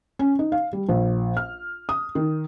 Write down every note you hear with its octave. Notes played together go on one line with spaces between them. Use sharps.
C#4
D#4
F5
G3
A#1
F6
D#6
D#3